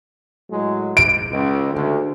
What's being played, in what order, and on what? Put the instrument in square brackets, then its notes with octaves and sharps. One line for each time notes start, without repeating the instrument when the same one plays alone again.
[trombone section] A2 F#3 G#3
[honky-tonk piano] D7
[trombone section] C#2
D2